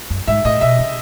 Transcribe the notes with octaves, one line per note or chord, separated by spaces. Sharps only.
F#2
G#2 E5
A2 D#5
B2 E5
C#3